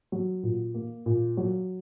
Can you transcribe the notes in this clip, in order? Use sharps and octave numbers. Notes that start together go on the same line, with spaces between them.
F#3
A#2
A#3
A#2
F#3